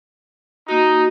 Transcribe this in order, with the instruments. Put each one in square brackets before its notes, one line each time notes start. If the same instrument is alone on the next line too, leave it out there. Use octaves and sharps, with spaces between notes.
[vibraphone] A#3 F#4 [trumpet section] D#4